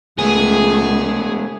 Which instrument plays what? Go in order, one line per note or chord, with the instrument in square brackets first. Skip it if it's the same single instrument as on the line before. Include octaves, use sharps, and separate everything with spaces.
[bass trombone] C#2 [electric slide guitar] G#3 B3 [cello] A3 [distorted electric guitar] G#4